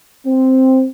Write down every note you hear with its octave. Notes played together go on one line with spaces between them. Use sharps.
C4